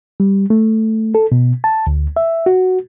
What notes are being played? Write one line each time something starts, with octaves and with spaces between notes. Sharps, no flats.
G3
A3
A4
B2
A5
D2
E5
F#4